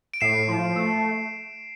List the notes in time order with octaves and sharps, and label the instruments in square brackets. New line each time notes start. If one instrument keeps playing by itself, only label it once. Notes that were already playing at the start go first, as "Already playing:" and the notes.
[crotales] D7
[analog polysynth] A2 [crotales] C7 E7
[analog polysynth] F3
A3